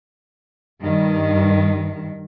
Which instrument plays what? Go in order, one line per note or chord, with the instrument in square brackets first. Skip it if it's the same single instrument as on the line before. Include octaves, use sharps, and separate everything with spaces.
[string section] G2 D#3